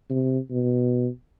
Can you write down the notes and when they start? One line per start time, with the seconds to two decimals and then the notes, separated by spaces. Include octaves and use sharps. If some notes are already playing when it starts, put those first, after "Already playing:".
0.10 C3
0.51 B2